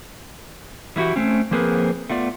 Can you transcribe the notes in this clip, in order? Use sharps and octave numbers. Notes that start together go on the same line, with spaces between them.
E3 G3 E4 F#4 G4
A3 C4 C#4
F3 A#3 C4 G#4 A#4 B4
A3 B3 F4 D5